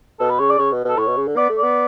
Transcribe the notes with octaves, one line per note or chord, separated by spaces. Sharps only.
B2 A4
B4
C#3 C#5
D5
C#3 C#5
B2
B2 A4
A2 C#5
B2
C#3
D3
B3 D5
A3
B3 D5